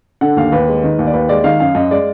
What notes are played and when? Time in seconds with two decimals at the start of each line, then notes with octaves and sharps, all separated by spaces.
0.21 D3 F#5
0.37 D#2 F5
0.52 D#2 B4
0.68 G#3
0.84 D#3
0.99 D#2
1.07 D5
1.14 D#2 B4
1.29 G#3 D5
1.44 D#3 F5
1.60 F#2 F5
1.75 F#2 D#5
1.91 G#3 D5